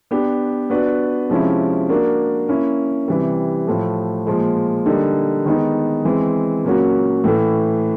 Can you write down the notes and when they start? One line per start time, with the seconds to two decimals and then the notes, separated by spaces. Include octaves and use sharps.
0.11 B3 D4 G4
0.70 B3 D4 F#4 B4 D5
1.30 C3 F3 G#3 C#4 E4
1.89 A#3 D4 F#4 A#4 D5
2.48 A#3 C#4 E4
3.08 C3 E3 G3
3.67 A2 F3 A3
4.27 A#2 F3 G#3
4.86 D3 G3 A#3 D#4
5.46 D#3 G#3 B3 D#4
6.05 E3 G#3 C4
6.64 A#2 F#3 A#3 C#4 F#4
7.24 A2 E3 A3